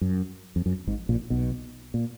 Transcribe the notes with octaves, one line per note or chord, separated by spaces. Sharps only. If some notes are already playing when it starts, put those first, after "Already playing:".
F#2
F2
F#2
G#1 G#2
A#1 A#2
B1 B2
A#2